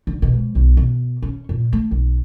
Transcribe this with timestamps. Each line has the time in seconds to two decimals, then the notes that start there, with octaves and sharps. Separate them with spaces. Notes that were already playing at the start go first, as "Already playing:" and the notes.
0.07 D3
0.22 B2
0.34 G#2
0.55 B1
0.77 B2
1.22 C#4
1.49 A#2
1.73 A3
1.91 B1